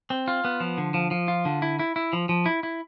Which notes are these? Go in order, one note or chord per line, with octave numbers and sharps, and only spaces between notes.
C4
F4
B3
F3
D3
F3
F3
F4
D3
E4
E4
E4
F3
F3
E4
E4